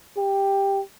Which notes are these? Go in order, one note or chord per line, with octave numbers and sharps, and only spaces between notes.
G4